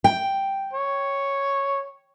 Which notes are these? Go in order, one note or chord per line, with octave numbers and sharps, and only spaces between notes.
G5
C#5